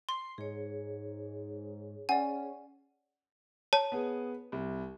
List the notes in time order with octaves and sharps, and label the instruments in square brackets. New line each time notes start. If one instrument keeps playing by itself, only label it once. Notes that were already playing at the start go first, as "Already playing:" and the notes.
[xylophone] C6 [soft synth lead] C7
[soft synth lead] G#2 [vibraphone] G#4 C#5
[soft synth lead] C#4 [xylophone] D5 G#5 [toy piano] F#5
[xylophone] C#5 A5
[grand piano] B3 G#4
C2